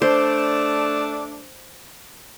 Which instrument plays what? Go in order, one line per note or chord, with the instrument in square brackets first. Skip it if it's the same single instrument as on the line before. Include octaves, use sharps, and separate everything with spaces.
[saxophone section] A3 D4 [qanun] C5